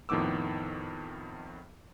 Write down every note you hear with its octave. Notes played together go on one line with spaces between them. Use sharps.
F2 A2 D#3 B3 D6 E6